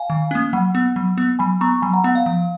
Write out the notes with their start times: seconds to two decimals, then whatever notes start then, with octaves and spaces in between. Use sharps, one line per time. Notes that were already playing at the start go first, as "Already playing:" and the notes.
Already playing: F5 G#5
0.10 D#3
0.31 A#3 C#4
0.53 F#3 F#5
0.75 B3
0.96 F#3
1.18 B3
1.39 F#3 G#5 B5
1.61 B3 A#5 C#6
1.82 F#3 G#5 B5
1.93 F#5 A#5
2.04 B3 F#5
2.15 F5
2.26 F3